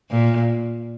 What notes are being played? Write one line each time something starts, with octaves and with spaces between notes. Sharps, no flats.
A#2